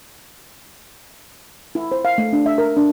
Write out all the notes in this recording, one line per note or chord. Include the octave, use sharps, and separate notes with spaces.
E4
C5
F5
A3
D4
E5
A#4
D4